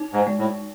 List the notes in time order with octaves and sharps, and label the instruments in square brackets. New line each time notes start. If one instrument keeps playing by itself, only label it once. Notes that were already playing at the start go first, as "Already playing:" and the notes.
Already playing: [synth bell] D#4
[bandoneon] G#2
[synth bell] G#3
[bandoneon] A2